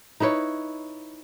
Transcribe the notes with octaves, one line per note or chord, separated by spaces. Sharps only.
D#4 E4 B4 C#5